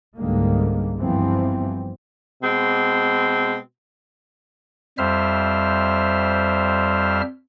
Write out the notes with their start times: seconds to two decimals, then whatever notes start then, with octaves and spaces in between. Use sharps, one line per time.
0.17 C#2 G#2 D3 G3 G#3 A#3
0.97 G1 G2 E3 F3 B3 C4
2.42 B2 G#3 C4
4.98 F2 G3 C5 E5 F6